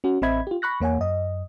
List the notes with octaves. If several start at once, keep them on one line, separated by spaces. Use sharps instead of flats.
C#4 F#4
A1 C4 D#5 E5 B5 G#6
F4 G4
B5 C#6 F#6 A#6
E2 A#3 C#5 F#5 G#5
F#2 D#5